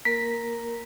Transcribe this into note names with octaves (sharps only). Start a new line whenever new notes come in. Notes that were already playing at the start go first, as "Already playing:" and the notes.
A#3 A#4 B6